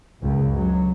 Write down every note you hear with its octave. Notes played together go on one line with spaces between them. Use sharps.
C#2 F#2
F#3